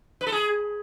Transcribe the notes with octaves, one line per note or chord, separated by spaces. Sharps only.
B4
A4
G#4